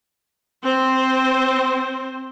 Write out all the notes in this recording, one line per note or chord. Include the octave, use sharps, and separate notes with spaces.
C4 C5